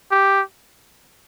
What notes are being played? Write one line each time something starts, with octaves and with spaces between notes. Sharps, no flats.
G4